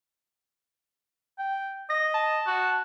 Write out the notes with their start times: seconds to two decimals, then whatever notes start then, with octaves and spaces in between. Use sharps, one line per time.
1.39 G5
1.90 D#5 A#6
2.14 A5
2.47 F#4